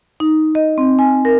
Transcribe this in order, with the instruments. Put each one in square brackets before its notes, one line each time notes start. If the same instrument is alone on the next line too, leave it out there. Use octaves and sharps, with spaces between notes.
[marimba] D#4
D#5
C4
G#5
A#4